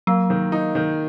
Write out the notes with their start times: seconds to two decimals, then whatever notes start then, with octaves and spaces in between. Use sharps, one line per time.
0.07 F#3 A#3
0.30 D#3
0.52 D#4
0.75 D#3